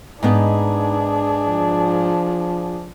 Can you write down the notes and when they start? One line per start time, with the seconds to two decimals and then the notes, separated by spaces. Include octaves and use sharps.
0.23 G#2 B3 D4 D#4 G#4
1.48 F3